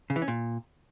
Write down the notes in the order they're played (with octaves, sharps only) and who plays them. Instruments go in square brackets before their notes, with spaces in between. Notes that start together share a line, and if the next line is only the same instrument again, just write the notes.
[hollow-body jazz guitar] C#3
E3
C#4
A#2